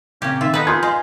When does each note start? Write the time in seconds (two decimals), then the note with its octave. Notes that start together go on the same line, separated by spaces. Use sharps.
0.22 A#2 C#3 A#3 C4 C#4 G4
0.41 D#3 F4 E5
0.54 B3 D#4 A4 B4
0.67 F4 G#4 C6 F6 G6 G#6 B6
0.83 G#3 F5